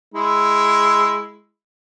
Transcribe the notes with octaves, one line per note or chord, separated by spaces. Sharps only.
G#3 E4